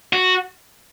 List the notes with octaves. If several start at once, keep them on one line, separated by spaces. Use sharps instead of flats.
F#4